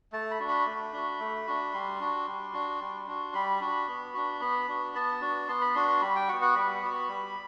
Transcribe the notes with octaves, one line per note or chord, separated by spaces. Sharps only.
A3 A5
B5
D4 F#4
B5
A3
D4 F#4
A3
D4 F#4
G3 C6
D4 F#4
G3
D4 F#4
G3
D4 F#4
G3 B5
D4 F#4
B3
D4 F#4
B3 B5
D4 F#4
B3 A5
D4 F#4
B3 C6
B5
D4 F#4 C6
C6
G3 B5
G5
B3 F#4 F#5
F#5
G3 B5
B3 F#4
G3